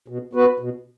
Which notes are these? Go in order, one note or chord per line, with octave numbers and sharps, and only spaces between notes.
B2
B3 F#4 B4
B2